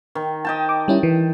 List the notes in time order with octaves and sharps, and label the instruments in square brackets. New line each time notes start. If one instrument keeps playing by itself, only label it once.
[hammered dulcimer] D#3
D#5 G5 A5
[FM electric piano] D6
G3 C#4 E4
E3